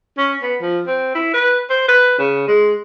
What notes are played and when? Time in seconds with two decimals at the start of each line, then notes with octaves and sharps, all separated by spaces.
0.18 C#4
0.42 B3
0.62 F3
0.86 C4
1.15 E4
1.34 B4
1.70 C5
1.88 B4
2.19 C#3
2.48 G#3